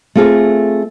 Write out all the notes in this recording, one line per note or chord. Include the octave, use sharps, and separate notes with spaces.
A3 C4 F4 G#4